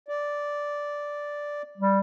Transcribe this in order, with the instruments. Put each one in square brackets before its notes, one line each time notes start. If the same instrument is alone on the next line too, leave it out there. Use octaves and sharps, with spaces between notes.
[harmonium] D5
[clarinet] G3